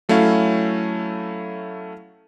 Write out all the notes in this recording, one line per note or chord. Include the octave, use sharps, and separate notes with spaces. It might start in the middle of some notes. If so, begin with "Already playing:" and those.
F#3 A3 C#4 E4 F5